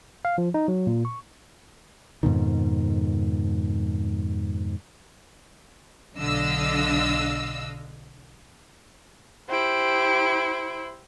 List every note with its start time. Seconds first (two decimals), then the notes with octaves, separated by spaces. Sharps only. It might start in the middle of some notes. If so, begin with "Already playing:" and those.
0.25 F5
0.38 F3
0.54 D#4
0.68 F#3
0.87 A#2
1.05 C#6
2.23 F2 G#2 B2 D#3
6.16 B1 D3 D4 D#5 F5 E6
9.49 E4 G4 C5 D7